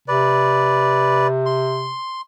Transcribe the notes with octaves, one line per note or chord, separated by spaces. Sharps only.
C3 B4 D5
C6